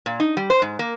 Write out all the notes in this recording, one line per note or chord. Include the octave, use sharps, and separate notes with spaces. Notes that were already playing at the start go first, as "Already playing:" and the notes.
A#2
D#4
G3
C5
G#2
A#3